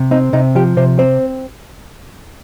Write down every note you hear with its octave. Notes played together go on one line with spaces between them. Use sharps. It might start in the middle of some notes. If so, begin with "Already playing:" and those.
Already playing: C3
C4 D#4
C3 D#4
F3 G4
C3 C5
C4 C5